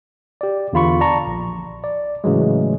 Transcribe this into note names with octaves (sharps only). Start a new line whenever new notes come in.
G4 D5
E2 D3 F4 B5 C#6
D5 A5 A#5 C#6
A#1
D5
A2 C#3 E3 F#3 G#3